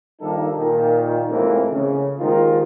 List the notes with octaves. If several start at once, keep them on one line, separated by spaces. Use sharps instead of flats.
G2 D#3 F3 A#3 D#4 A4
A#2 D#3
F2 A2 C3 E3 G#3 A#3
C#3
G#1 D#2 G#2 D#3 F4 A#4